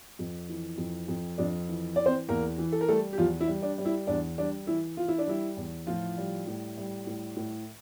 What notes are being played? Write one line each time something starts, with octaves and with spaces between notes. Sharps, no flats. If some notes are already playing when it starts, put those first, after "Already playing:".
F2
E3
F2
F2
F2 D4
E3
E3 D5
C4 C5
E2 A#3 A#4
E3
A4
A#4
G3 A3 A4
G4
E2 F3 F4
E4
G3
D4
G3
E4
E2 D4
G3 D4
E3 E4
E3 F4
E4
D4
G3 E4
E2
A2 F3 F4
G3
A2
G3
A2
A2